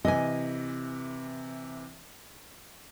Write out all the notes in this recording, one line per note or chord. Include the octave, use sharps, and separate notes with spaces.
C3 E3 D#5 G#5